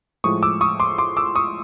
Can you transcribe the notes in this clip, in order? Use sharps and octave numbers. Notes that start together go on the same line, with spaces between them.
A2 F3 G#3 C#6 D#6
D6 E6
C#6 D#6
C6 D6
C6 D6
D6 E6
C#6 D#6